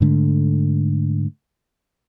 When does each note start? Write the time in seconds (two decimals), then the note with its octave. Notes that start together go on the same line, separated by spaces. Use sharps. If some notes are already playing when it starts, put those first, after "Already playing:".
0.01 G#2 D3 A3